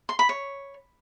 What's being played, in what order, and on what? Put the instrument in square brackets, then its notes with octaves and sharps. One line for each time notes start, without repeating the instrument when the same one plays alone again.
[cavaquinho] C6
B5
C#5